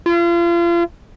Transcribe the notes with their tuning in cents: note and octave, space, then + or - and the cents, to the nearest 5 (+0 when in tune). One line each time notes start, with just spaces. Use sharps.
F4 -35